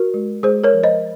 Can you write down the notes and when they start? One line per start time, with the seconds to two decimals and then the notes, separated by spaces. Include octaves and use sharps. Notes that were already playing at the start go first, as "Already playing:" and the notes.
Already playing: F#4 A#4
0.14 G#3
0.43 G#3 G#4 C5
0.64 A#4 C#5
0.74 F3
0.83 C5 D#5